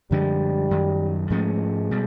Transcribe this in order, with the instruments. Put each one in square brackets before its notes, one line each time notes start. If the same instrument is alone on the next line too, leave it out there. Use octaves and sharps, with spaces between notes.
[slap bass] F#2 D3 F3 G#3 [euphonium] G3
[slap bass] F#2 D#3 F#3
[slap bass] G#2 F3 A3 C#4 [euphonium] G#3
[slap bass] B2 G3